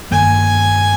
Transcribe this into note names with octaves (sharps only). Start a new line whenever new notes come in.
G2 D#3 G3 A#3 G#5